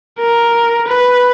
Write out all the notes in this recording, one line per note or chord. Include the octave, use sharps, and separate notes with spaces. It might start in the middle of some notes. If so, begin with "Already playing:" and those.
A#4
B4